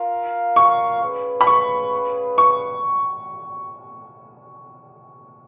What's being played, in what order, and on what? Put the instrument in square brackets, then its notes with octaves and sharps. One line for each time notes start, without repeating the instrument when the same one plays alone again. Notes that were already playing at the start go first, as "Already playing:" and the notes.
Already playing: [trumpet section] F4 A#4 F5
[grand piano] C#6
[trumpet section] C#4 G#4 B4 F5
[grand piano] B5
C#6
C#6